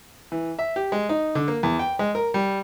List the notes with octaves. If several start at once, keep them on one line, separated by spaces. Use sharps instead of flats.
E3
E5
G4
G#3
D#4
D3
A#3
E2
G5
G#3
A#4
G3